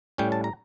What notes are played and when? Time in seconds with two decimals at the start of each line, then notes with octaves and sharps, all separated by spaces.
0.18 A2 G3 C#4 G5
0.32 A5
0.44 A#5